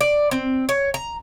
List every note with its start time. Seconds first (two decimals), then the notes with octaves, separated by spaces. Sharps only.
0.01 D5
0.31 C4
0.69 C#5
0.94 A#5